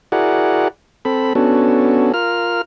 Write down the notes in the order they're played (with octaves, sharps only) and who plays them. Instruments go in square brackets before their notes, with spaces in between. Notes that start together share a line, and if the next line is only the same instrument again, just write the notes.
[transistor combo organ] E4 F#4 G#4 A#4 D5 F#5
C4 A4 B5
B3 C#4 D4 F#4 A4
F4 A#4 F6